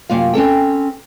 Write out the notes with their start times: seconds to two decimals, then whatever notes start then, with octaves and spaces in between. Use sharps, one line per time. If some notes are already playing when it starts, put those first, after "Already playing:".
0.10 F#2 C3 A#3 F4 F5
0.34 C4 C#4 A4 G5